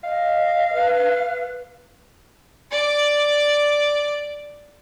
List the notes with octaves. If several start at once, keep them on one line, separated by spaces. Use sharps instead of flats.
D#5 F5
B4
D5 D6